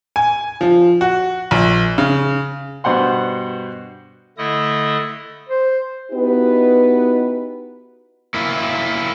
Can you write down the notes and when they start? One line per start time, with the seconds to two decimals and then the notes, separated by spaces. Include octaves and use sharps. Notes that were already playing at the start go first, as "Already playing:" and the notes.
0.16 G#5
0.61 F3
1.01 F#4
1.51 A#1
1.98 C#3
2.84 G2 B2 C5 F#5 C6
4.38 D3 A3 E4 A4 D#5 D#6
5.49 C5
6.12 B3 D#4 E4 F#4 G4 B4
8.34 A#3 E4